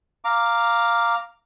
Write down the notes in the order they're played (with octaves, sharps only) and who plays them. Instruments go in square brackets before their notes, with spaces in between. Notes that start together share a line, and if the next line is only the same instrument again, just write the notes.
[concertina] F5 A#5 D6